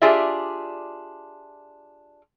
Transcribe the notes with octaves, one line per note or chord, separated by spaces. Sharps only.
D4 F4 G4 G#4 D5 E5